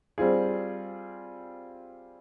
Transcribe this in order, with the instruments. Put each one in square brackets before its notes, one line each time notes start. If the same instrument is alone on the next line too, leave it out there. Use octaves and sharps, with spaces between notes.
[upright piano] G3 C4 F4 G#4